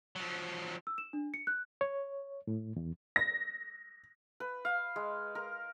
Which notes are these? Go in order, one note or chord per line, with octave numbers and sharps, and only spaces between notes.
F3 F#3
E6
E7
D4
C#7
F#6
C#5
A2
E2
A#6
B4
F5
G#3
A#4